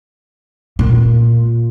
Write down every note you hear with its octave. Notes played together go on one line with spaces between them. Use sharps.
A#2